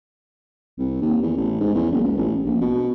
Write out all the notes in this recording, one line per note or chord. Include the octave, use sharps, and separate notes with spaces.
C2
D#2
E2
A1
G#2
E2
F#1
C#2
A1
A#1
B2